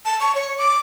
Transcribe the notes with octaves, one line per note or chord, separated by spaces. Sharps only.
A5
C#6
C#5
D6